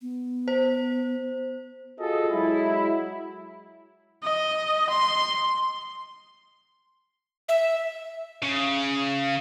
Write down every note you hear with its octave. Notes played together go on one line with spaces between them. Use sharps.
B3
C5
F4 F#4 G#4 A4 D#5
F#3 G#3 E4
D#5
C6
E5
C#3